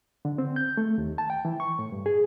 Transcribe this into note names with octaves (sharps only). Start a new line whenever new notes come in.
D3
C4
G6
A3
D#2
A5
G5
E3
C#6
A2
G2
G#4